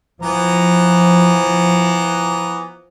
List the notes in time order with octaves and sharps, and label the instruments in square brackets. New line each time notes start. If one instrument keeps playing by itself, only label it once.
[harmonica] E3 B3 A#5 [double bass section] F3